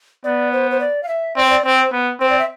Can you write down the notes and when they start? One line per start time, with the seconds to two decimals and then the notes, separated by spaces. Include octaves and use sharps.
0.24 B3 D5
0.52 C5
0.71 C5
0.80 D5
1.03 F5
1.08 E5
1.36 C4 D5
1.44 C5
1.50 D5
1.65 C4 C5
1.92 B3
2.20 C4 C5
2.30 D5
2.39 E5